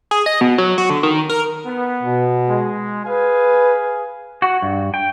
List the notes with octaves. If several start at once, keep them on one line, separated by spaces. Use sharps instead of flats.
G#4
D#5
B2
F#3
F#4
D3
D#3
A#4
B3
B2
G#3
G#4 B4 F5 G#5
F#4
G2
G5